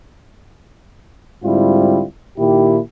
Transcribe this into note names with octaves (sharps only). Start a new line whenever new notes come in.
G#2 D3 G3 C4 E4 F4
A#2 D#3 E4 G4